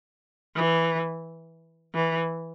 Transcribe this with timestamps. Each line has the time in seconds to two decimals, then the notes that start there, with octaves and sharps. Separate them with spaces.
0.56 E3
1.95 E3